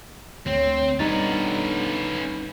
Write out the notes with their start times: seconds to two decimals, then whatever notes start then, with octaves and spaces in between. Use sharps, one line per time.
0.46 D2 C4 C#5
0.99 B2 D3 G3 C#4 D#4 B4 A6